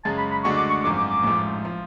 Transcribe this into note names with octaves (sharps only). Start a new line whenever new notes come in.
F#2 C#3 G#3 A5
B5
B5
D2 D3 G#3 D4 F#4 C#6
D6
C#6
G#1 F#2 F3 D6
D6
D6
A1 G#2 F3 A3
F3